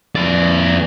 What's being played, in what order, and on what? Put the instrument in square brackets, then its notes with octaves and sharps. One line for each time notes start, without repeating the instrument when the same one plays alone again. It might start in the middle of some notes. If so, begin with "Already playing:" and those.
[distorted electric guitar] F2 D5